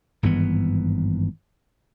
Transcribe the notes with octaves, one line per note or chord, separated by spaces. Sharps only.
G#1 G2 E3 B3